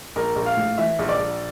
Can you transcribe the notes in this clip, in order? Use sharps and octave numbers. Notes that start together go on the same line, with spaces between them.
A#1 A#4
A#1
F5
A2
E3 E5
A#1
D5
A#1